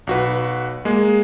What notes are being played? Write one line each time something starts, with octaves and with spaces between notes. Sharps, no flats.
B1 F#4 B4
G#3 A#3 G#4